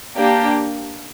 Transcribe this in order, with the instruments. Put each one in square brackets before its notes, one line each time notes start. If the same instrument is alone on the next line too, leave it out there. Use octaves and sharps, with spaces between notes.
[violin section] A#3 D4 G4